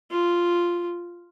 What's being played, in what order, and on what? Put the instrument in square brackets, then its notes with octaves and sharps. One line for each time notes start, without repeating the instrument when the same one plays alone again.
[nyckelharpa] F4